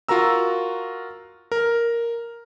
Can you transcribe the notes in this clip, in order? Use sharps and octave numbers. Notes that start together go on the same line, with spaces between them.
F4 F#4 A#4 A#5 E6
A#4